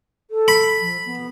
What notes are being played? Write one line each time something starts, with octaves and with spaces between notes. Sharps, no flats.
A4
B5
F3
B3